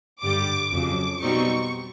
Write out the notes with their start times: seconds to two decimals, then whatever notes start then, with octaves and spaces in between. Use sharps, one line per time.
0.22 G2 D3 G3 D6
0.72 F2 C#3 F#3 D6
1.21 B2 G3 C4 D#4 C#6